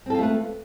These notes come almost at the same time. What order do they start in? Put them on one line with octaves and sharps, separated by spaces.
C4 A4 F4 A3 B4